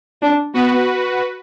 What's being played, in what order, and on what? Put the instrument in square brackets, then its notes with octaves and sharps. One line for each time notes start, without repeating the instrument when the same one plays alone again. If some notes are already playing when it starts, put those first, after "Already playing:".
[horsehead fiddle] D4
[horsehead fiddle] B3 [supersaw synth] F#4 B4